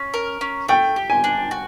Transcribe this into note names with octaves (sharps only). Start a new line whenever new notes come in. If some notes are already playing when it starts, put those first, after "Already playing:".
Already playing: C#4
A#4
C#4
A3 G5
G4
G#5
D4
F#4